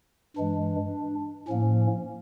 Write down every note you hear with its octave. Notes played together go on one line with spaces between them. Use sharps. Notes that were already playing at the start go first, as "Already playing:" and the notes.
G2 E3 G#3 D4
A2 F3 A#3 C#4